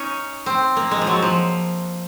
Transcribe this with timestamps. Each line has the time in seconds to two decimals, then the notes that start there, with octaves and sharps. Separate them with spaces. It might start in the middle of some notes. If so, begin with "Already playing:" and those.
Already playing: C#4 D#4
0.46 C4
0.77 A#3
0.91 G#3
1.02 F3
1.07 F#3
1.22 F3